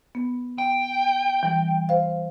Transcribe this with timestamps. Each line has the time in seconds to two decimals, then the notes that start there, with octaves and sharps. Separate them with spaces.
0.15 B3
0.58 G5
1.43 E3 G3
1.89 C5 F5